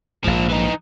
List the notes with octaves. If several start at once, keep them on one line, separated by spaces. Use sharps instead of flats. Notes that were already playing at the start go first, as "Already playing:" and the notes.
A#1 G#2 F3 A#3
E3 D#4